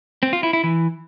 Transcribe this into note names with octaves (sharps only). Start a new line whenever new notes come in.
C4
F4
E4
E4
E3